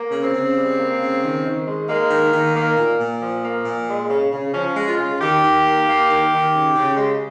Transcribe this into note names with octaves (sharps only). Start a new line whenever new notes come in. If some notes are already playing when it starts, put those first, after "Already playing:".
Already playing: A#3
C#3
C4
C#3
G3
A#3
C#3
D#3
D#3
G#3
G#3 A#3
D#3
D#3
A#3
A#2
A#2
F3
A#3
A#2
G#3
C#3
C#3
F3 C#4
G#3
F4
C#3
D#3 G4
D#3
A#3
A#3
D#3
D#3
C#3
C#3
G#3